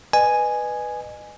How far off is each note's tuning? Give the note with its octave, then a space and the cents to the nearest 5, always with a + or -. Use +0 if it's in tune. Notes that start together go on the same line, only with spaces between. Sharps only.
B4 +0 D#5 -35 G#5 +0